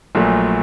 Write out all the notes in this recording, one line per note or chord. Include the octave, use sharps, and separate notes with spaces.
A#1 A#2 F#3 A3